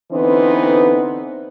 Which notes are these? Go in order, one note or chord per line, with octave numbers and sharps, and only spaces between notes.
D3 E3 B3 C4 D#4 C5